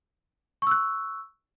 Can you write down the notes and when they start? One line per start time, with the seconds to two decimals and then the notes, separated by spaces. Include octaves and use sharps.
0.62 C#6
0.67 E6
0.71 F#6